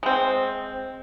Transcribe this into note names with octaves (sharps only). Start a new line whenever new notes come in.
G#3 C4